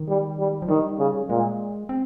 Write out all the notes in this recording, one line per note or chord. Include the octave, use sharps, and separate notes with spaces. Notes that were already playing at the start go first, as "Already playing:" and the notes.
Already playing: D#3
G3
G3
F3
D#3 G3
C#3
A#2 G#3
C4